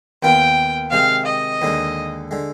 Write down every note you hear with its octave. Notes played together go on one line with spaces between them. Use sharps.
D#2 D#3 B3 F4 G5
C3 D#3 G#3 F5
D#5
D#2 D3 G#3
D3 G#3